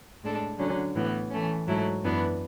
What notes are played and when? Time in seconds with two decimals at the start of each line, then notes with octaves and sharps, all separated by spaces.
0.23 A2 G#3 D4 A4
0.59 D3 F#3 C#4
0.95 A2 E3 B3
1.31 E3 A3 C#4
1.67 G#2 F#3 A3 E4
2.03 F#2 E3 B3 D4